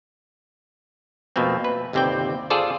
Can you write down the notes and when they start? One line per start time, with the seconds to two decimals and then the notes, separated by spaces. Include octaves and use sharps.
1.36 F2 B2 A3 A#3 C4
1.64 B4
1.93 G1 D#2 C3 C4 D5 G5
2.50 F4 G#4 A4 C5 D5